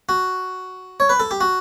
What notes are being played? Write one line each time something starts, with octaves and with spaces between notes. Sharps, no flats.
F#4
C#5
B4
A4
G4
F#4